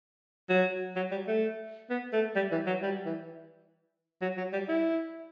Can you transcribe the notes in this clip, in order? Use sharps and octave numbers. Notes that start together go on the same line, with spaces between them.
F#3
F#3
G3
A3
B3
A3
G3
E3
F#3
G3
E3
F#3
F#3
G3
E4